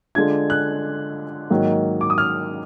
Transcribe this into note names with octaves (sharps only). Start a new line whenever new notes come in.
D3 G#3 D4 F4 G#6
F#6
G#2 D#3 F#3 A#3 D#4
D6
D#6
F6